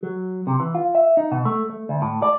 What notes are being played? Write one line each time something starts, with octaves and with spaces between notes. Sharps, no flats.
F#3
C3
E3
F4
E5
D#4
B2
A3
A3
D2
A2
D5